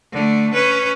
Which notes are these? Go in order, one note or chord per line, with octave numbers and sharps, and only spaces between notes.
D3 A3
C#4 B4